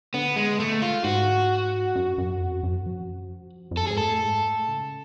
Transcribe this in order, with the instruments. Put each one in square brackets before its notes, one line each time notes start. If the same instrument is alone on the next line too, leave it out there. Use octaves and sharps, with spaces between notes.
[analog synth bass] D3 [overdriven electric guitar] B3
[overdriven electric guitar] G#3
A3
F4
[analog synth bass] G#2 [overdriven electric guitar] F#4
[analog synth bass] F#2
F#2
F2
F#2
F3
F2
[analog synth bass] F#2 [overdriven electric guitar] A4
[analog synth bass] G#2 [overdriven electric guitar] G#4
[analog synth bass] A2 [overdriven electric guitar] A4
[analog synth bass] G#2
A2
C#3